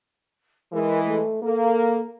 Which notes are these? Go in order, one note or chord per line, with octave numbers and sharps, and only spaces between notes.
E3 G#3 A#4
A3
A#3 A4